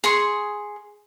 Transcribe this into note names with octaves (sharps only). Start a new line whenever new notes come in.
G#4 C6 C#6